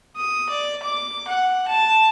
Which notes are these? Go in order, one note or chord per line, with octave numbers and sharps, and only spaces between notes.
D#6
D5
D6
F#5
A5